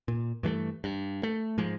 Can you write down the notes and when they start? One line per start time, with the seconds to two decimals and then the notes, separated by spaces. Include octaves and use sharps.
0.08 A#2
0.43 G2 E3 G#3 A3
0.84 G2
1.23 A3
1.58 G#2 F3 G#3